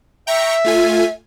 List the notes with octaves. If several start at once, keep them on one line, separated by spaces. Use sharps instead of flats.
E5 G5 A#5 C#6
A3 F4 G#5